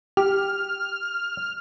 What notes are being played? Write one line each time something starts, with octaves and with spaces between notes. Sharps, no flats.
G4 F6